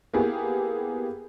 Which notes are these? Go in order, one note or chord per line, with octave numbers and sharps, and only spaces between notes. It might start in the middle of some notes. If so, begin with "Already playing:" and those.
A#3 B3 E4 G4 G#4